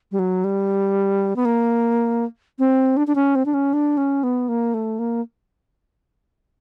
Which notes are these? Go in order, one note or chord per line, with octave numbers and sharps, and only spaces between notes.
G3
F#3
G3
B3
A#3
C4
D4
D4
C#4
C4
D4
C#4
D4
C#4
B3
A#3
A3
A#3